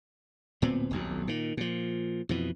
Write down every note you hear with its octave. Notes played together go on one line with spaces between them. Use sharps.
D1 A#2 B3 C4
D#1 B1 F2
A#2 D#3
A#2 F3
F2 B2 E3